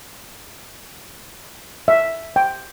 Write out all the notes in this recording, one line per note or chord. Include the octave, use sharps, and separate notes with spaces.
E5
G5